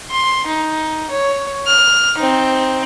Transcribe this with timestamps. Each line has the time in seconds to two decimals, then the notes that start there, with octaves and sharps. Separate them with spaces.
0.10 C6
0.47 D#4
1.10 C#5
1.67 F6
2.18 C4 D#4